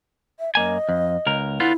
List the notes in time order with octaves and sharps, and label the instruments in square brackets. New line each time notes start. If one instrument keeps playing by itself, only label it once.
[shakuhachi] E5
[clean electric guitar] F#2 A#3 G#5 [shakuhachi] D#5
[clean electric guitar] F2
C#2 A#4
[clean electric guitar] D3 B3 F4 [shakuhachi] E4